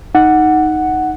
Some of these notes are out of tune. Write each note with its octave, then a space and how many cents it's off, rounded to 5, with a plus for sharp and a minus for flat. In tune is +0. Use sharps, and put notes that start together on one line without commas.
D#4 +0 F#5 +0